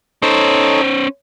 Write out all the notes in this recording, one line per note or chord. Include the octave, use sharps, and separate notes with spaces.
C#4 D#4 A4 C5 C#5